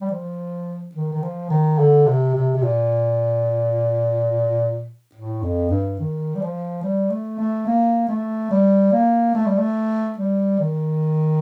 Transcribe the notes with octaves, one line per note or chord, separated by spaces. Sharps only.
G3
F3
D#3
D#3
F3
D#3
D3
C3
C3
C3
A#2
A2
F2
G2
D#3
G3
F3
G3
A3
A3
A#3
A3
G3
A#3
A3
G3
A3
G3
D#3